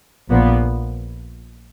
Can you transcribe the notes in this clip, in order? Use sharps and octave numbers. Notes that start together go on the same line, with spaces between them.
A#1 A#2 F3 B3